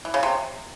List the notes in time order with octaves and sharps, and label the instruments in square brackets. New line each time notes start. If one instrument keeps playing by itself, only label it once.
[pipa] E3
C#3
C3